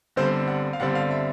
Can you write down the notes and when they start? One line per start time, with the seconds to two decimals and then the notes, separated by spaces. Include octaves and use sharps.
0.16 G1 G2 D3 G3 C4 C5
0.48 F#5
0.73 F5
0.80 G1 G2 D3 G3 C4 F#5
0.95 F5
1.11 E5